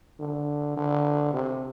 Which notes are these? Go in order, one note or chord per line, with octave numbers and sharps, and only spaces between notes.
D3
D3
C3